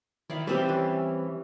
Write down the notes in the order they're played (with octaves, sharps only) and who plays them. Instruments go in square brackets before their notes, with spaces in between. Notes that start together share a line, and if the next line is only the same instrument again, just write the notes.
[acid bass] D#3 [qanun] E4 D5 F5
[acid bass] E3 [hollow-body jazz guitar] G3 C4 G4 [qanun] B4 E5 C6
[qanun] C#4